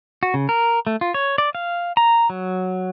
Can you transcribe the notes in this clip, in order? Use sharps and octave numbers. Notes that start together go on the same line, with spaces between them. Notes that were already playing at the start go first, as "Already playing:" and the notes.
F#4
C#3
A#4
A3
F4
C#5
D5
F5
A#5
F#3